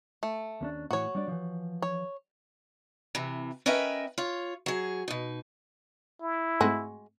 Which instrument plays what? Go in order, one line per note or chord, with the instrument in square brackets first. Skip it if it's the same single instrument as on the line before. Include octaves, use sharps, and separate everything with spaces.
[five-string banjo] A3
[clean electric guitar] D#2 C#4 D4
[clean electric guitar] A2 E3 [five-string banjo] F#4 C#5
[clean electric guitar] G3 D4 D5
E3 F3
[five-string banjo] C#5
[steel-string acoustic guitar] C3 E3
C#4 A#4 B4 D#5 E5 G5
F4 C#5
F#3 G#4
B2 D#4
[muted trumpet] E4
[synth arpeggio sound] G#2 A3 C4 [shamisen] G#3 F#4